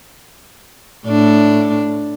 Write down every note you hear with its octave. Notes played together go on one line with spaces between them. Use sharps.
A2 D4